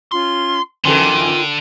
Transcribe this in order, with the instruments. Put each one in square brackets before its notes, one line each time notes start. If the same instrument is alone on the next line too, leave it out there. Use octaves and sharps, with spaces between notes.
[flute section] C#4 F4 [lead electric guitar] C6
[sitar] F2 E3 A4 [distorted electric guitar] D3 [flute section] D#4 A#4 G5 [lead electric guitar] F4